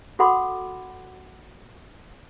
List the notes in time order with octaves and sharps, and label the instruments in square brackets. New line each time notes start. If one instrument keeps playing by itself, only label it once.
[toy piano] F#4 A4 F#5 B5 C6 D6